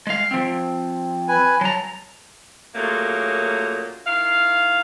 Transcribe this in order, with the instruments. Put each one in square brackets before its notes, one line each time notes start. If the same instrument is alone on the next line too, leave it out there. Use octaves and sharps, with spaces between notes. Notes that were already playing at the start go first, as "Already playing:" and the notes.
[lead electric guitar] G#3 F5
F3 C4
[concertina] B4 G#5
[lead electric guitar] F#3 A#5 [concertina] A5
[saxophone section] A#2 C#3 F#3 A3 A#3
D#3 E4 F5